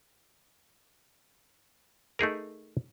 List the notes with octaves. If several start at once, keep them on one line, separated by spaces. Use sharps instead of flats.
A3 D#4 G#4 A#4